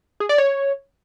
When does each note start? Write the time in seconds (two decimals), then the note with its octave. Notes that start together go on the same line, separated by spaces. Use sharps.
0.20 G#4
0.29 D5
0.38 C#5